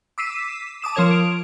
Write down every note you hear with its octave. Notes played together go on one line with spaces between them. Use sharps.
D6 E6 B6 C7 D#7 E7
A5 D6 D#6 E7
F3 F4 A#4 C#5 G#6 F7
D7